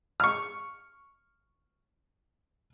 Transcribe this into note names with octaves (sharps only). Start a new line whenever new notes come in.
C#6 F6